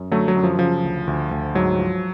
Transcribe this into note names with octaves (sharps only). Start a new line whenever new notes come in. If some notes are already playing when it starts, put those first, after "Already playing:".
Already playing: F#2
D3 F#3 A3
F#3
F#2
F3
C#3 F3
D2
D2
D2
G#2 F#3
F3